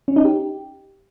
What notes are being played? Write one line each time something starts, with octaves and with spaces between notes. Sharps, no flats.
C#4
D#4
G4